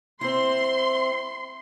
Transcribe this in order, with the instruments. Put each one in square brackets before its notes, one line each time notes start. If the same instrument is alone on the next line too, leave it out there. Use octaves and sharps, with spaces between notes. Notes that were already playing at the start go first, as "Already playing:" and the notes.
[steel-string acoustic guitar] C4 E4 [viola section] C6